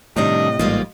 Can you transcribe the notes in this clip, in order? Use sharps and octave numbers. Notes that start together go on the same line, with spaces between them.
A2 C3 D#3 G3 D4 D#5
A1 G#2 G3 A#3 F4